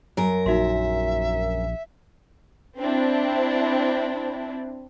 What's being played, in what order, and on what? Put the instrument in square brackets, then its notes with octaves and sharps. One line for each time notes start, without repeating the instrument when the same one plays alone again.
[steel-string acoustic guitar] F#2 A#4
[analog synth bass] A#1 [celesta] D#4 F#4 C6 [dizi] E5
[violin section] C4 D4 E4